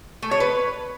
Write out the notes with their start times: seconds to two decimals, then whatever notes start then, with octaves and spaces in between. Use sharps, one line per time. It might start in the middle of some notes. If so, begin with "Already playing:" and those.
0.22 A3
0.31 C#5
0.40 B4